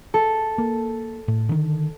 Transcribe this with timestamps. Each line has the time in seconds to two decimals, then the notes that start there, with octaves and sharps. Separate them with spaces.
0.14 A4
0.58 A#3
1.28 A2
1.49 D3 D#3